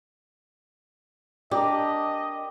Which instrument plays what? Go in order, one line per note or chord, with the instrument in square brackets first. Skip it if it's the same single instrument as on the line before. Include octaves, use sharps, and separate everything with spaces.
[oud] D4 [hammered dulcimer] G4 A#4 [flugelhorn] D#5